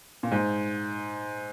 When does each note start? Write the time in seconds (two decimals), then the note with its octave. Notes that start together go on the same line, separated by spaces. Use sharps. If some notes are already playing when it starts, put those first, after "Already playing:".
0.23 A#2
0.31 G#2